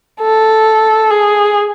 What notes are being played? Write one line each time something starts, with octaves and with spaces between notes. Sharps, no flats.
A4
G#4